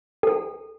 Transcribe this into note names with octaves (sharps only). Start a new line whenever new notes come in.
A4